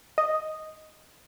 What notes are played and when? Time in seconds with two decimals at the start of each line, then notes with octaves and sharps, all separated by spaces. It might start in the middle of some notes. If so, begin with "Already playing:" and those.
0.18 D#5